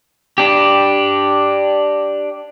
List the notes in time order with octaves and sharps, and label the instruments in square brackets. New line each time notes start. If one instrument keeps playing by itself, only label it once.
[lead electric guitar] D4 G4